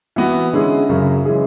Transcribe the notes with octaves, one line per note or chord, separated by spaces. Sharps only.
E3 B3 F#4
D3 G#3 C#4 E4 G#4
F#2 C#3 F#3 C#4 G#4
E3 G#3 C#4 G#4